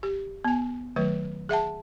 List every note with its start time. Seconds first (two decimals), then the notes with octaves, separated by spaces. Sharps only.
0.03 G4
0.45 B3 G#5
0.96 D#3 F#3 A3 B4
1.49 G#4 E5 F#5 A5